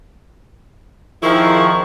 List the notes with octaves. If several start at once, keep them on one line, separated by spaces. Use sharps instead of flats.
F2 D#3 F3 E4 G#4 A#4 C#6